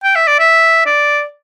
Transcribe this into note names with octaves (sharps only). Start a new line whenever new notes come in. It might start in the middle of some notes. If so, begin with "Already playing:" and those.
G5
E5
D5
E5
D5